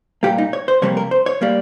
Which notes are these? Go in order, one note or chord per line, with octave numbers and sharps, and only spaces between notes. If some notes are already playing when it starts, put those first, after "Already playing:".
A#2 G3 A#3 G4
D#4
C#5
C5
F2 C3 G3 A#3 C#5
A#4
C5
C#5
G3 A#3